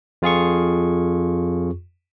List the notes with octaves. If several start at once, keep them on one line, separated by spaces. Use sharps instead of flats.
F2 F4 G#4 C#6